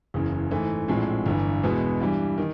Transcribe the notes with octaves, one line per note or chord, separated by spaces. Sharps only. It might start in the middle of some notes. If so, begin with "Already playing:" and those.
F#1 E2 C#3
G#2 E3 A3
A#1 A2 F3 G#3 C4
G1 G2 E3
E2 B2 G#3 B3
G2 E3 G3
D#3